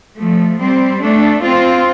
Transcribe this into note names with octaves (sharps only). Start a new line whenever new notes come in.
F3 A3
G3 C4
A3 D4
C4 F4